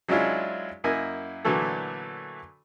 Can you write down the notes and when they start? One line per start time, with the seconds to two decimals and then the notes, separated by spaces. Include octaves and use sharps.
0.08 F#3 G#3 C#4 D4 E4 F4
0.84 F#2 A#3 E4 D#5 G#5
1.45 A#2 D3 E3 F#3 A3 A4